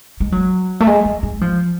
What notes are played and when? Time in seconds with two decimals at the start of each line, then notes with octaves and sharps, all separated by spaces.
0.20 G#3
0.32 F#3
0.80 A3
0.87 G#3
1.05 G#3
1.23 G#3
1.41 F3